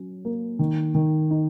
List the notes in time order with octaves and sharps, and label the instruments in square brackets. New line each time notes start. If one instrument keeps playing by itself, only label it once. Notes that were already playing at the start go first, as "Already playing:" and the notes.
Already playing: [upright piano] F#3 C#4
A#3
D#3
D#3
D#4